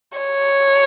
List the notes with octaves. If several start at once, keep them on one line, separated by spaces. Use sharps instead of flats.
C#5